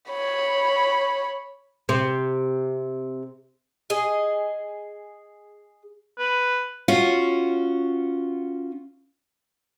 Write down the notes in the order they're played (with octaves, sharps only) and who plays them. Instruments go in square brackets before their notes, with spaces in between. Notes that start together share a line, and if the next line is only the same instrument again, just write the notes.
[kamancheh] C#5 B5
[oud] C3 C4
[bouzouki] G#4 D#5
[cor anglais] B4
[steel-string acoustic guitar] C#4 F4 F#4